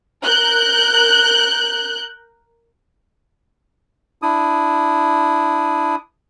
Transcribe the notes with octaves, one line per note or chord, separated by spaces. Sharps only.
A#4 F#6 G6
D4 E4 D#6